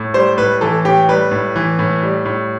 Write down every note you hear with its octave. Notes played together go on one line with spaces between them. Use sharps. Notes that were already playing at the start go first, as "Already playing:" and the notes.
Already playing: A2
G3 C5
A2 B4
E3 A4
A2 G4
G3 B4
A2
E3
A2
G3
A2